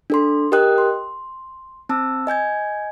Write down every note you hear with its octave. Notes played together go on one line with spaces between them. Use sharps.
D4 A4 C6
G4 A#4 D#5 G5 D#6 F#6
C6
C4 A5 E6
D#5 G#5 G6 G#6